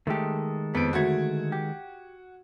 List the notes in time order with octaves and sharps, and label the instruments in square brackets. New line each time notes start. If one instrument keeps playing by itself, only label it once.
[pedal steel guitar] D#3 G#3 A4 [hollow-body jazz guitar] A3 G4
[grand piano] F2 D7 [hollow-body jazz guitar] B3
[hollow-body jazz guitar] D2 A3 [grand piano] F#4 G#6
[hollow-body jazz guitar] G4